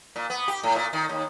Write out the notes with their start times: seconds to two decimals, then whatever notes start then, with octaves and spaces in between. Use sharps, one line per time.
0.16 A#2
0.30 B3
0.48 G4
0.63 A2
0.76 A#2
0.93 D#3
1.09 D#2